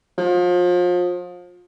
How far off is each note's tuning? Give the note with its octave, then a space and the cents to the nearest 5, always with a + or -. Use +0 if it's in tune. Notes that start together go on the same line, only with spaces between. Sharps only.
F3 +35